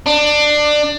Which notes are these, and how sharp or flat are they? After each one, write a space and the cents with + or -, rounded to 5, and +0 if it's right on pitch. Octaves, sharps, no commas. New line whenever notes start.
D4 +20